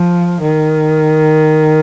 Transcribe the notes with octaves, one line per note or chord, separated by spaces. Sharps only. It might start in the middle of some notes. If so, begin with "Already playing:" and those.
Already playing: F3
D#3